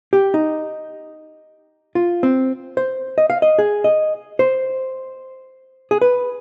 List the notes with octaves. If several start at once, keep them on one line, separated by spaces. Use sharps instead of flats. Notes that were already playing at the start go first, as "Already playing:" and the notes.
G4
D#4
F4
C4
C5
D#5
F5
D#5
G#4
D#5
C5
G#4
B4